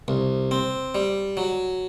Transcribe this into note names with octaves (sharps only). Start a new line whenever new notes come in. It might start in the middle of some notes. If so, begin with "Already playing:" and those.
C2
C4
G3
F#3